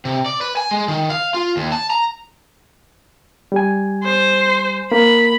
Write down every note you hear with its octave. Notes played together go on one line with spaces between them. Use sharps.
C3
D5
B4
G#5
G#3
D#3
F5
F4
D#2
A5
A#5
G3 G#5
C5
A#3 A#4 B5